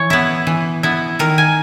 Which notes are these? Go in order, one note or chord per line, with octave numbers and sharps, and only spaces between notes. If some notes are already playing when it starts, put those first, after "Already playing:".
Already playing: E3 C#5
B3 E4
E3
B3 E4
D#3 A#4
G#5